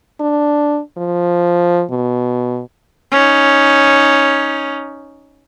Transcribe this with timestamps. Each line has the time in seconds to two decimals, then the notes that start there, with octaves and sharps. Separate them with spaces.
0.20 D4
0.97 F3
1.91 B2
3.12 C#4 D#4